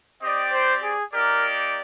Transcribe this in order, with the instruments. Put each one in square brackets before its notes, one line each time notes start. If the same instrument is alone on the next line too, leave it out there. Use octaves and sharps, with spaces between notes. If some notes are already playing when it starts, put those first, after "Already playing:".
[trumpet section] C4 G4 D5 G5 [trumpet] D#5
[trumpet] C5
G#4
[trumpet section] A#3 D#4 G4 D5 [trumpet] A#4